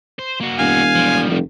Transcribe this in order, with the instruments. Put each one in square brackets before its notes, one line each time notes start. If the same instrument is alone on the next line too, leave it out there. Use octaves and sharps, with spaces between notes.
[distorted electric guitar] C5
A#3 F#4
[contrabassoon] E1 [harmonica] F5 G#5
[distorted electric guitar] F3 G3
[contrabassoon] F1